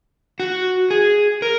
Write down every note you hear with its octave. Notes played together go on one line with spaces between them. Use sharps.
F#4
G#4
A#4